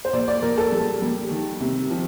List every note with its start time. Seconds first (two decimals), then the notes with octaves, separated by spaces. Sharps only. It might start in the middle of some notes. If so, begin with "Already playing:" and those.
0.05 C5
0.13 A#2 D5
0.28 D5
0.42 A#2 A#4
0.58 A4
0.72 G3
1.02 G3
1.31 D#3
1.60 C3
1.90 F3